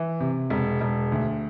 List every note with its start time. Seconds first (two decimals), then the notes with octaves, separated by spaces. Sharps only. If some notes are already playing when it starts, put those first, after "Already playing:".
Already playing: E3
0.20 C3
0.50 E1
0.81 E1
1.12 D2